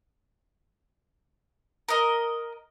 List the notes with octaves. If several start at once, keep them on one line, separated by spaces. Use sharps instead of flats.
A#4 D#5